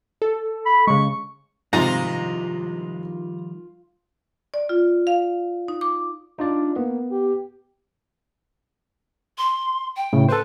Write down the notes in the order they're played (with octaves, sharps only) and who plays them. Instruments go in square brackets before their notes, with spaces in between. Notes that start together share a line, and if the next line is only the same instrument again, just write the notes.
[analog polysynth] A4
[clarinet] B5
[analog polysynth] C#3 G#3 [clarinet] C#6
[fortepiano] G#2 C3 [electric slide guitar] D#3 F3 G3 [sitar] F4 [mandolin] A#5
[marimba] D5
F4
F5
D#4
D6
[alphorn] D4 [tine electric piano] D#4 F4 D5
[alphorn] A#3 [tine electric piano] B3
[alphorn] G4
[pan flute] C6
G5
[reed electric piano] A2 C#3
[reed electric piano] A4 C5 [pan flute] B4